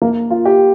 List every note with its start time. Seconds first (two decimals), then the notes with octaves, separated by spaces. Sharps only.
0.02 A#3
0.30 F4
0.45 G4